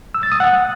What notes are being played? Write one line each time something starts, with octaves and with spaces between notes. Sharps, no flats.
E6
A6
D#6
F#5